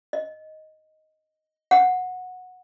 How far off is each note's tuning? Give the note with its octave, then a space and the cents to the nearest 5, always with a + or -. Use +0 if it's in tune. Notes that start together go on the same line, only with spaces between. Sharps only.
D#5 +5
F#5 -15